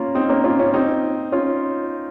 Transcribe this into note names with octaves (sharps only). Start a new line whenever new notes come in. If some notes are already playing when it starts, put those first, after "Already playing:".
Already playing: A#3 C#4 F4
C4 D#4
A#3 C#4
C#4 F4
C#4 F4
C4 D#4
C#4 F4